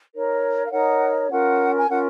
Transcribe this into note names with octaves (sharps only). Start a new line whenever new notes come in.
D#4 A#4 C#5
F5
D#4 A#4 C#5 F#5
C#4 F4 A#4 F#5
G#5
C#4 F4 A#4 F#5